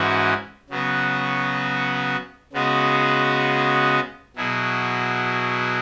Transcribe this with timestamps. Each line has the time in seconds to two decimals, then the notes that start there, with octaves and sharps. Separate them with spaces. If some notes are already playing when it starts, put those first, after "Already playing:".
Already playing: G#2 E3 C#4 F#4
0.70 C#3 F#3 B3 F#4
2.53 C#3 G#3 B3 F#4
4.36 B2 F#3 E4 G#4